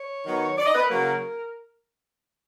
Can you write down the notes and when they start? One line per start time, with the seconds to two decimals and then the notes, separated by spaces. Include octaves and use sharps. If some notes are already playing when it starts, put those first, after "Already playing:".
Already playing: C#5
0.25 D#3 F#3 B3
0.58 D5
0.66 D#5
0.75 B4
0.83 A#4
0.90 C#3 F#3 A#3